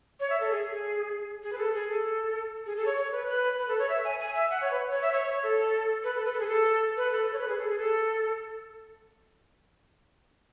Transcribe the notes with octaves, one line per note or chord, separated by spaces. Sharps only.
C#5
E5
A4
G#4
G#4
B4
A4
G#4
A4
G#4
A4
C#5
C#5
B4
B4
B4
A4
C#5
E5
G#5
G#5
E5
F#5
C#5
B4
C#5
E5
C#5
C#5
A4
B4
A4
B4
A4
G#4
A4
B4
A4
A4
C#5
B4
G#4
A4
G#4
A4